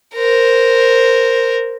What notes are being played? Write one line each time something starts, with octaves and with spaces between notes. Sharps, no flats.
A#4 C5